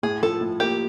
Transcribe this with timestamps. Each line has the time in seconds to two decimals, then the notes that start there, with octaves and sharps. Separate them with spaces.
0.03 A2 G#4
0.23 F3 A4
0.41 A2
0.60 A#3 G4